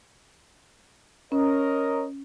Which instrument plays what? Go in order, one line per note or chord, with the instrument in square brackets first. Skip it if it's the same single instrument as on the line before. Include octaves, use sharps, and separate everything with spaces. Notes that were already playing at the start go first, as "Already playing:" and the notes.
[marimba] C#4 [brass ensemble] A#4 C#5 D#5